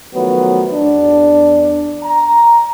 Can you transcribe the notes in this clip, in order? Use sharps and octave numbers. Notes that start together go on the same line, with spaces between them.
D#3 F3 F#3 A3 B3
E2 D4
A#5